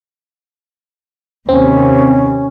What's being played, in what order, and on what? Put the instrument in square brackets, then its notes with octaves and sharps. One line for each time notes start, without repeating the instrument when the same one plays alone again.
[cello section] D#2 C3 [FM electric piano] C4 [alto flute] C#4